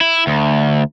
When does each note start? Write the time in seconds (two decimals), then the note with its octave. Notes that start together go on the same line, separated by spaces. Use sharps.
0.01 E4
0.27 D2